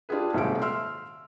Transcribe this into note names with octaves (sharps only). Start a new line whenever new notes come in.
D4 F4 G4 G#4 B4
D#1 G#2 C3 F#3 F5 D7
E5 C6 E6 F6